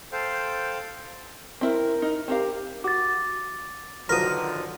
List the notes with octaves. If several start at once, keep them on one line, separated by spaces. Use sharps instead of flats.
A4 C5 F5 G5
C4 E4 A#4
D#4
C4 G4 A#4 F5
F#4 D6 A6
D3 D#3 F3 F#3 A#4 B4 D#6